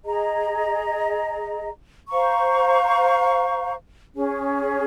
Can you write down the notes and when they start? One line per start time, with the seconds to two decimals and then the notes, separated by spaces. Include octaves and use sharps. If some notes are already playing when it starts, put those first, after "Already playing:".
0.05 G#4 D#5 A#5
2.09 C5 F5 A#5 C#6
4.15 C#4 G#4 C#5